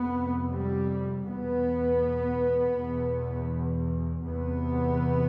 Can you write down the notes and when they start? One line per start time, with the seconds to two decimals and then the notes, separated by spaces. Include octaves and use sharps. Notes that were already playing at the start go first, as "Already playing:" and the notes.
Already playing: F2 C3 B3
0.52 G3
1.27 E2 B2 B3
2.76 E2 B2
4.26 E2 C3 B3